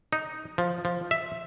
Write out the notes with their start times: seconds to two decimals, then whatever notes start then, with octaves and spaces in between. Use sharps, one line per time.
0.13 D#4
0.58 F3
0.85 F3
1.11 E5